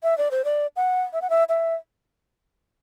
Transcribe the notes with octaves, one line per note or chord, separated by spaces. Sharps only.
E5
D5
C5
D5
F#5
E5
F#5
E5
E5